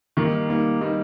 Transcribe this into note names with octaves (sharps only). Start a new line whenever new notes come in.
D#3 G3 A#3 D#4
G3 A#3 D#4
G3 A#3 D#4